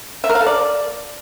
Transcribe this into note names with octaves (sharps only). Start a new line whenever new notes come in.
E5
A#4
F5
A4
D5